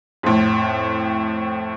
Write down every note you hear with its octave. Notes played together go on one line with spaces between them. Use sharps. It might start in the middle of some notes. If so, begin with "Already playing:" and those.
F2 A2